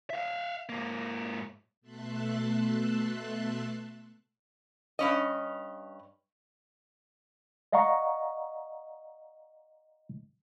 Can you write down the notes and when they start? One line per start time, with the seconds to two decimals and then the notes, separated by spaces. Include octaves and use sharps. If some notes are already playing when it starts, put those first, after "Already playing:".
0.10 E5 F5
0.69 G#2 A#3
1.81 B2 A3 E5 A5 C6 F#6
4.99 G2 C#4 D#5
7.72 D5 D#5 F5 F#5 A#5 C#6